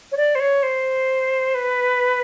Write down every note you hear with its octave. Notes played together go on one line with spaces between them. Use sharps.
C#5
D5
C5
C#5
C5
B4